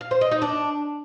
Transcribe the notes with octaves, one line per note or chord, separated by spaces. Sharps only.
F5
C5
D#5
D#4
D4